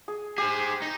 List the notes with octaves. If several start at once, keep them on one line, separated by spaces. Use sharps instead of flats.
G#4
G4 G#4 C5
D#4